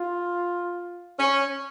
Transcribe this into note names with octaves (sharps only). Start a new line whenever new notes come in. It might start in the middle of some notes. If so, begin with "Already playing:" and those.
Already playing: F4
C#4